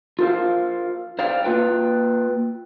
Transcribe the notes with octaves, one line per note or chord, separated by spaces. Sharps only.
F4 A#4 C5 F5
C5 D5 F5 G5
A#3 F4 B4 G5